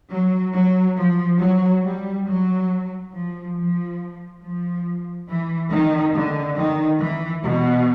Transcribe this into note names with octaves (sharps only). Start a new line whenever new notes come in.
F#3
F#3
F3
F#3
G3
F#3
F3
F3
F3
E3
D#3
D3
D#3
E3
B2